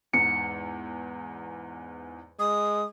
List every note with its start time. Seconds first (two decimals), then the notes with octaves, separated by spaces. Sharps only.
0.13 E2 G#2 C#7
2.39 G#3 D#6